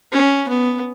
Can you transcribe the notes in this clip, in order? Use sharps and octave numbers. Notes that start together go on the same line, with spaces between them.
C#4
B3